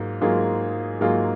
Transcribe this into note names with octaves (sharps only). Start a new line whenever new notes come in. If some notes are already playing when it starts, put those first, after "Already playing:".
Already playing: G#2 F#3 A#3 F4
G#2 F#3 A#3 F4 G#4
G#2 F#3 A#3 F4 G#4